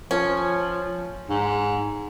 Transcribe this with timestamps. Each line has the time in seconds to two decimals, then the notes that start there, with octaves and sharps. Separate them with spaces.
0.11 F3 C#4
1.29 G#2